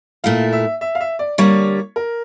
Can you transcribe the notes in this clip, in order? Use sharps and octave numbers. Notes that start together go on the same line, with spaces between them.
A#2 A3 E4 F5
E5
E5
F5
E5
D5
D3 G3 A#3 C#5
A#4